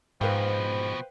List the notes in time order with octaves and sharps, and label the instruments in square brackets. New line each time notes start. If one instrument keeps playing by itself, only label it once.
[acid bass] G#2 [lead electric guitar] B2 F3 [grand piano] B4 F5 G5 [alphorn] C5